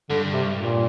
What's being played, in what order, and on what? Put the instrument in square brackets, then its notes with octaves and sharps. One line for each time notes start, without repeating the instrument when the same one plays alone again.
[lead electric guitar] G2 [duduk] D3
[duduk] C3
A#2